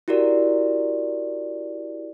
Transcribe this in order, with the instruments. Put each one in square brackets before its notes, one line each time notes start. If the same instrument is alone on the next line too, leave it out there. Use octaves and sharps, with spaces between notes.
[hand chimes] E4 F#4 G4 A#4 D5